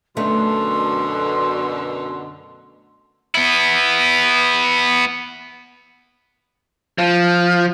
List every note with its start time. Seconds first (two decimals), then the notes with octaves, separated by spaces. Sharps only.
0.17 F#2 B2 D3 A3 C6
3.35 B3 E4
6.98 F3